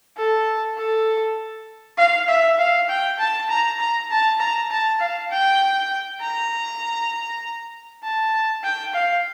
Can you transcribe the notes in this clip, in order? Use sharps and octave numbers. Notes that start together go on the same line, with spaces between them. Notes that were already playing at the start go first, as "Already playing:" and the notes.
A4
A4
F5
E5
F5
G5
A5
A#5
A#5
A5
A#5
A5
F5
G5
A#5
A5
G5
F5